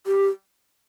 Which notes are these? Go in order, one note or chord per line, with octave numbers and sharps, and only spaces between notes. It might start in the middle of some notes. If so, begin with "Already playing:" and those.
G4